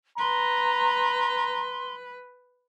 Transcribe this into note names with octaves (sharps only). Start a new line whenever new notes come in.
B4 A#5 C6